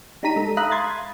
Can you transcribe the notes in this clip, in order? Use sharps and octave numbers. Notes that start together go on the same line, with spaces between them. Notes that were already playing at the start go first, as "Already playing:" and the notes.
D4 D#4 G4 A#5 B6 D#7
G#3 A4
E5 F5 A#5 B5 D#6 F#6
B5 C6 G#6 A6